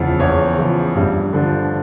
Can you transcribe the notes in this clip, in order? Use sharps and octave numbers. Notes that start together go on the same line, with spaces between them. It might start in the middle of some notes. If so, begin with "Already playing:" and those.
Already playing: E2 C#3 F3
E2 C#5
C#3 F3
G2
D3 F3